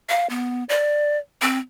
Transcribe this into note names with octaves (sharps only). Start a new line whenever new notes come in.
F5
B3
D5
C4